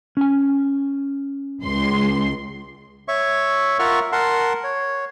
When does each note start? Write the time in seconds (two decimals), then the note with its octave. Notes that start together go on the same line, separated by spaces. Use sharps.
0.17 C#4 G#5
1.62 C#2 C6
3.08 C#5 E5 C#6
3.79 F4 A#4 E5 F#5 C#6 F6
4.12 A#4 F#5 A5 C6
4.64 C#5